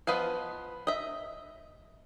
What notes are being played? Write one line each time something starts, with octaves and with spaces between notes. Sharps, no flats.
F3 B3 B4 D#5 F5
D#5 E5